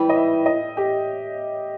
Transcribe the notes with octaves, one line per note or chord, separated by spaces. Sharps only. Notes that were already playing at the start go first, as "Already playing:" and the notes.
Already playing: G#2 E3 G3 G5
D#5
E5
D#5
G4